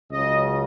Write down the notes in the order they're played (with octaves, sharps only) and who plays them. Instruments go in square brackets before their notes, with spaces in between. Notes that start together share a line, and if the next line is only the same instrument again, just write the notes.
[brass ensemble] C#2 C#3 F#3 D#5